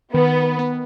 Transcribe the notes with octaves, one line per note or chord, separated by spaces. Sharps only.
D#3 B3
B3